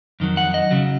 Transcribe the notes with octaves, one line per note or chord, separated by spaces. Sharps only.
F2 D#3 F#3
F#5
D#5
C#3 F#3